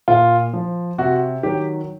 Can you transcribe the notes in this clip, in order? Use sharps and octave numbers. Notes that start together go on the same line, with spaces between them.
A#2 F4
F3
C3 F#4
D#3 F#3 G4